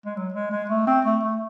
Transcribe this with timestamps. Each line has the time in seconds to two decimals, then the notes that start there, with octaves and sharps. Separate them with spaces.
0.06 G#3
0.16 F#3
0.34 G#3
0.52 G#3
0.70 A3
0.87 C4
1.05 A3
1.23 A3